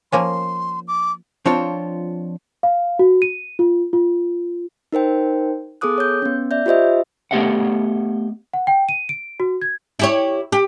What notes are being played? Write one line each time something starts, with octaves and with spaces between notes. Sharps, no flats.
F3 A#3 C#4 C6
D6
F3 C4 D4 F4 C#5
F5
F#4
D#7
F4
F4
D#4 A#4 C5 G5
B3 G#4 A4 D6 D#6 F#6
C#5 G6
B3 C#4
D5 E5 G6
F4 G4 C5 D#5 E5
A3 B3 G4 D#5 F5 F#5
F#5
G5
D#7
D7
F#4
G#6
E4 G4 C#5
G4